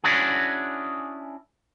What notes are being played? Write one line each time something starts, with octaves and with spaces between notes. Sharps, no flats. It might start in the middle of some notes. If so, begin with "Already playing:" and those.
C#4 D4 E4 F#4 G#4